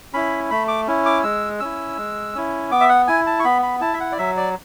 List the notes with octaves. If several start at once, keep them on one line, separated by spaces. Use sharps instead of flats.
C#4 E4 B5
A3 B5
D6
C#4 E4
D6
G#3 E6
C#4 E4 E6
G#3
C#4 E4
B3 D6
E5
F#5
E4 G#5
A5
C#6
B3 B5
B5
E4 A5
E5
F#5
D5
F#3 E5
D5